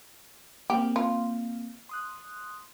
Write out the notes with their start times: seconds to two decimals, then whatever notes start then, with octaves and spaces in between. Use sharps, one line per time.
0.70 A#3 C4 G4
0.96 F4
1.89 C6 D#6 F#6